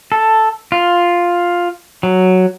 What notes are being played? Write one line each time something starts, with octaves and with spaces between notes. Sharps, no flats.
A4
F4
F#3